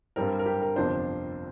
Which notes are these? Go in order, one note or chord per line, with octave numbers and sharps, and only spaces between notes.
G2 G3 C4 A#4
A#4
G4
A#4
G1 F2 C3 F3 D4 C5